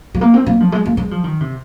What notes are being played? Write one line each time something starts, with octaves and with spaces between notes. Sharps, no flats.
G#3
A#3
C4
A#3
F3
G#3
A#3
G#3
F3
D#3
C3